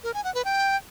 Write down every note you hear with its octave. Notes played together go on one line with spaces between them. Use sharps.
A#4
G#5
F#5
B4
G5